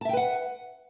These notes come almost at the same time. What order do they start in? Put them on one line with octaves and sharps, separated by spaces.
A5 E5 G5 B4 F#5